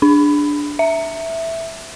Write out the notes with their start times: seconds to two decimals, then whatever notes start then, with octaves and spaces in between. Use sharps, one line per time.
0.02 D4
0.79 E5